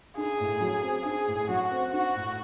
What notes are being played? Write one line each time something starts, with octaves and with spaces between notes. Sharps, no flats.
D#4 G#4
A2
F#3
C4
D#4 G#4
A2
F#3 F#4
C4
D#4 F#4
A2